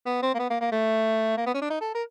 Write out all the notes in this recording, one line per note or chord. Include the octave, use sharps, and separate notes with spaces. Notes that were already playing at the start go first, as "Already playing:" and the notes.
B3
C4
A#3
B3
A#3
A#3
A3
A#3
B3
C#4
D4
D#4
A4
A#4